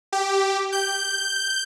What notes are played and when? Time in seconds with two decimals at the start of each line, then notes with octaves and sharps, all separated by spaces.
0.13 G4
0.72 G6